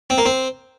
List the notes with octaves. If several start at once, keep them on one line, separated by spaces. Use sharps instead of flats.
C4
A#3
C4